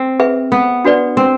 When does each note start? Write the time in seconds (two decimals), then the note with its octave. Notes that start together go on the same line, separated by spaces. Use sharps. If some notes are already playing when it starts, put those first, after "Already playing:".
Already playing: C4
0.20 G#4 B4 E5
0.52 B3
0.85 D4 F#4 B4 D5
1.17 C4